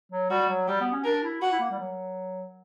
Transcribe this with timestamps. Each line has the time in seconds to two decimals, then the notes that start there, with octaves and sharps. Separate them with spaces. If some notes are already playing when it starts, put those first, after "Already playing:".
0.12 F#3
0.30 G3 F#4
0.49 F#3
0.68 G3 G4
0.80 B3
0.92 C#4
1.04 D4 A#4
1.23 E4
1.41 F#4 F#5
1.52 E4
1.60 A#3
1.70 G3
1.79 F#3